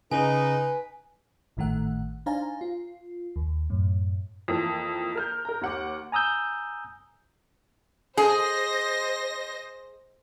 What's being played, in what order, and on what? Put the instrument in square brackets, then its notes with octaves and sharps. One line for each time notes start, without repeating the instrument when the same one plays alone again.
[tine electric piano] C#3 [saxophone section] D#4 [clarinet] B4 [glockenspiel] G#5
[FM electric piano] G#1 A2 D#3 A3 F#5 F#6
D4 D#4 C5 F5 G#5 A#5
F4
D#2
F#2 A2
[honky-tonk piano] F2 E3 A#3
A#4 F6 G6
A#4 A#5
D#2 F#5 D6
[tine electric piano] G#5 A#5 D#6 E6 G6
[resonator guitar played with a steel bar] G#4 [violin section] C5 D#5 A#6